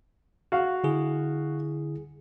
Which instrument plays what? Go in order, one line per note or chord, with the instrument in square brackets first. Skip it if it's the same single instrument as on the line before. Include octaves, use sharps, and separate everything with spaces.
[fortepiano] F#4 F5
[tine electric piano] D3 E4 G#4